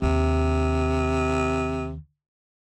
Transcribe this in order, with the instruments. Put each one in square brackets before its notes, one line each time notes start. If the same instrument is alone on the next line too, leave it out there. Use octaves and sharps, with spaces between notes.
[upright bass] D#2 D4 [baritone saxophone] C3